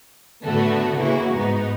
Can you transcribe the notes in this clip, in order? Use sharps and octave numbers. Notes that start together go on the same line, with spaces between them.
A2 D3 A3 B3 F#4
C#3 E3 A#3 E4 F#4
G#2 B3 D#4